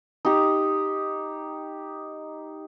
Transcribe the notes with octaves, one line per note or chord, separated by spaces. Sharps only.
D#4 G4